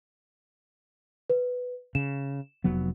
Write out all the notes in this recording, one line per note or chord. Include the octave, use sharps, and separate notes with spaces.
B4
C#3 E7
F1 F#3 B3